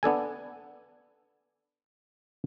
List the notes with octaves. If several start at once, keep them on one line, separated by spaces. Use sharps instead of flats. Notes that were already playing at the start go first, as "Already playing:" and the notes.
B3 D4 A4 G#5